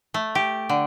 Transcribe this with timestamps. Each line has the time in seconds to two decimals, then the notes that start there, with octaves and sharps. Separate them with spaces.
0.14 A3
0.35 G4
0.69 D3